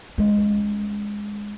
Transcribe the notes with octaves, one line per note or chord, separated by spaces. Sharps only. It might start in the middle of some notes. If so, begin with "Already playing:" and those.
G#3 C#4